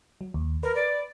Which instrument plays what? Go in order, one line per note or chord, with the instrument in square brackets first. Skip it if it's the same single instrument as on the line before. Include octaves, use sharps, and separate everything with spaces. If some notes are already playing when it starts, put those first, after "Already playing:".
[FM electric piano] F#3
D#2
[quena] A#4 [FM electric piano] B4
[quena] D5